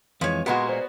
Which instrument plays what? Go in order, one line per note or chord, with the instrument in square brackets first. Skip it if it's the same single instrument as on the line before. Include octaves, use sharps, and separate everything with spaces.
[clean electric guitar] F2 E3 G#3 [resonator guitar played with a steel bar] F3 C#5
[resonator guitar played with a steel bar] A#2 G#3 A#3 [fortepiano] B3 F#4 [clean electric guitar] G4 B5 C6
[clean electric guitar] C5 D5